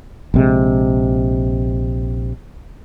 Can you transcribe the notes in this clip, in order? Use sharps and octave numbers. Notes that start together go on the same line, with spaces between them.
A#1 C3 G#3